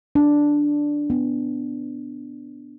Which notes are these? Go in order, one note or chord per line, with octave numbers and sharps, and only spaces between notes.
D4
B3